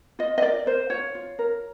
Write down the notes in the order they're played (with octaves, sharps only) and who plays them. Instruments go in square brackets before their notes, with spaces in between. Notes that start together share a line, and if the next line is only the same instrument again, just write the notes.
[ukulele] F4 D#5
D#5
A#4 D5
A#4 C5
F4 C#5
F4
A#4